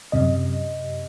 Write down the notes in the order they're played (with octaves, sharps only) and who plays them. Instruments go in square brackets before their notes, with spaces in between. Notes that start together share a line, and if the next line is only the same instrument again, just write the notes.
[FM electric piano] F#2 C3 D#5